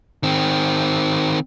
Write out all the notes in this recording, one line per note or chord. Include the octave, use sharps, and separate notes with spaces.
D#3 C4